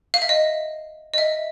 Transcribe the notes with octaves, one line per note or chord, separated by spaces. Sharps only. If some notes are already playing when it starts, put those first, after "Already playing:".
F5
E5
D#5
D#5
E5